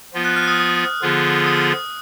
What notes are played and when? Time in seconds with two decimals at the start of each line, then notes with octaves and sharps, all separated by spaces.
0.14 F3 B3 F4
0.25 F#6
0.36 F6
0.48 D#6
1.02 D3 F3 B3 F4 G#4
1.46 D#6